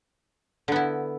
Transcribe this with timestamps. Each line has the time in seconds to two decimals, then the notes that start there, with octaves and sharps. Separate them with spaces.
0.68 D3
0.72 B3
0.76 E4